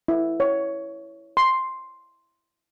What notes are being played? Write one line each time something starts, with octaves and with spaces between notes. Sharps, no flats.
E4
C#5
C6